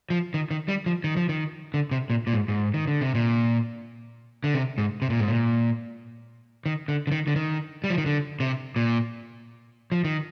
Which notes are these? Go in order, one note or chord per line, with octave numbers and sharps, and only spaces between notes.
F3
D#3
D#3
G3
F3
D#3
F3
D#3
D3
C3
A#2
A#2
G#2
G#2
D#3
D3
C3
A#2
D3
C3
G#2
C3
A#2
G#2
A#2
D#3
D3
D3
D#3
D3
D#3
G3
F3
D#3
D3
C3
A#2
F3
D#3